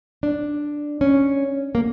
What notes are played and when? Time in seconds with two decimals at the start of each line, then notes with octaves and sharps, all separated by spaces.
0.23 D4
1.01 C#4
1.75 A#3